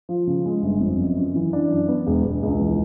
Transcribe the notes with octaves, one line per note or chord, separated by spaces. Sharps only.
F3
C#3
G#3
G1
F2
F#2
F#2
E3
D4
F#2
B3
E1
E1
C#2
E3